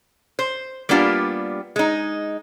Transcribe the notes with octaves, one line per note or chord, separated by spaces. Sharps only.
C5
G3 A#3 B3 D4 F4 G4
G#3 D#4